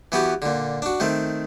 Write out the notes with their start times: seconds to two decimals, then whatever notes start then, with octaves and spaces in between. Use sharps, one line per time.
0.12 E3 B3 F#4 G4
0.42 A#2 D3
0.82 D4 F#4
1.00 D#3 A3 C4